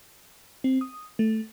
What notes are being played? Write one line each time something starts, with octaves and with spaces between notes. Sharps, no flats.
C4
D#6
A3